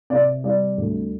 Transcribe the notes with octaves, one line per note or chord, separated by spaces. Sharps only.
C3 D5
G3 D5
D2